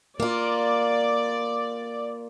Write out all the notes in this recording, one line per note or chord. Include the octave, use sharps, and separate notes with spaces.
A#3 F4 D5